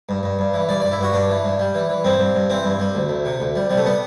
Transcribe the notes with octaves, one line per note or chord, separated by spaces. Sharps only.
G2
G2
G2
E3
G2 D5
G2 D5
E4
G2 F#4
G2 D4
E3
G2
G3
E3
E3
G2 C4
G2
G2
E3 C4
G2
G3
D2
D2
C3
D2
G3
C3 G3
A3
G3 B3